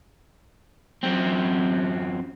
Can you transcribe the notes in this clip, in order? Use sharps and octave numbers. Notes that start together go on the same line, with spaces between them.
F#2 C4